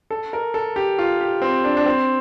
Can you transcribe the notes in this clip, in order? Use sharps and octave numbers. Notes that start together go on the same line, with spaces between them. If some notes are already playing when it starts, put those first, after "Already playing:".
A4
A#4
A4
G4
F4
G4
C4
D4
D4
C4